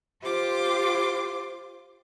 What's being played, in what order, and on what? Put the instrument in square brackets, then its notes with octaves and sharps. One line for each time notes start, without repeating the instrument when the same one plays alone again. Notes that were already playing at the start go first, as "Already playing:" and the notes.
[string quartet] F4 G4 C5 D6